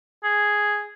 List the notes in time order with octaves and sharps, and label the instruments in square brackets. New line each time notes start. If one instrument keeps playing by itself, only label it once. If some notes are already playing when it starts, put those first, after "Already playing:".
[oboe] G#4